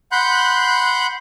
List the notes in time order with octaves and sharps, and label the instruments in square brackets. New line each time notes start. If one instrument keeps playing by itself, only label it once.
[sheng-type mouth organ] F#5 B5 C6 F#6 G6